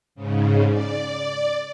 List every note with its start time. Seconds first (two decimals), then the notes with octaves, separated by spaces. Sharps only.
0.15 G#2 C#3
0.70 D5